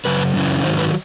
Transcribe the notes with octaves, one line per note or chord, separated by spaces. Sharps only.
F#2 C#3 F#3 B4
F#2 C#3 E3
G#2 D#3 F#3 C5
B4